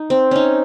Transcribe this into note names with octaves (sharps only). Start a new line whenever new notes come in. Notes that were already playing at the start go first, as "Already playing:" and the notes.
Already playing: D#4
C4
C#4 D#4